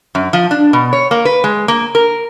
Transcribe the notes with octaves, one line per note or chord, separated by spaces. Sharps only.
F#2
F3
D4
B2
C#5
A#3
B4
G#3
A#3
A#4